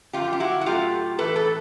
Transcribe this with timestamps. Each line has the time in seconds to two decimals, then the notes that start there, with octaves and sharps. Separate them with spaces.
0.13 F#2 D3 F3 A3 F4 G4
0.33 G4
0.40 E4 F#4
0.61 F#4
0.66 A2 F#3 A3 F4 G4
1.19 A2 E3 A3 A4 B4
1.36 A4 B4